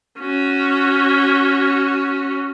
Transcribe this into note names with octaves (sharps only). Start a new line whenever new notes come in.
C#4 F#4